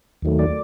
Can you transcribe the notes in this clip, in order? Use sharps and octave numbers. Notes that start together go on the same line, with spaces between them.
D#2 D#3 F#3 A3
D5